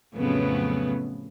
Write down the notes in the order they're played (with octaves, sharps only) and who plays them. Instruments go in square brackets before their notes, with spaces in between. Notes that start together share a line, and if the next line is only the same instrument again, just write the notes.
[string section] F2 A2 C#3 F#3 B3